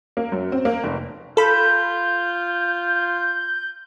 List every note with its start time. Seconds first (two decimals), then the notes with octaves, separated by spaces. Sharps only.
0.17 A#3
0.32 F#2
0.52 C4
0.65 A#3
0.84 F1
1.37 F4 A4 B5 G6